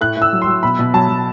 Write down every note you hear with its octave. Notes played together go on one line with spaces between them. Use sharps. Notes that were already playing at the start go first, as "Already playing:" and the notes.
A2 F#6
A2 E6
F#3
C6
F#3
B2 B5
B2
F#3 A5
F#3